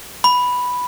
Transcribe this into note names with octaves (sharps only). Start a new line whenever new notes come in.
B5